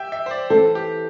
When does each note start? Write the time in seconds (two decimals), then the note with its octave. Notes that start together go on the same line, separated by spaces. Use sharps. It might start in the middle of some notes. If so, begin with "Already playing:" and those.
Already playing: G4 E5 G5
0.12 E5
0.26 C5
0.31 D5
0.50 E3 C4 A4 C5
0.75 G4